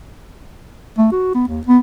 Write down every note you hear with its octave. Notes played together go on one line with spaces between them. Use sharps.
A3
F#4
B3
D#2
B3